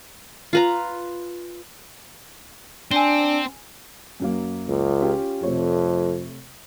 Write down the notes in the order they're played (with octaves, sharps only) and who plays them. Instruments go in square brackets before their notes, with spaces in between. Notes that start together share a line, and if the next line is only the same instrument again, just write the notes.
[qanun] F4 B4 A#5
[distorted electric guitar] C4 [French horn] D4 [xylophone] G#5 G7
[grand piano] F#2 F#3 A#3
[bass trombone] C#2
[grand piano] C#4 F4 G4
[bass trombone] F2 [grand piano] C3 A3 C#5